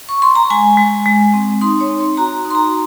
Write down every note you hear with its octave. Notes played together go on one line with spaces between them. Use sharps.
C#6
C6
A#5
G#3 G#5
G#3
G#3
C4
D#4 C6
C#5
C4
C6
F#4 A#5
D#4
C6
A#5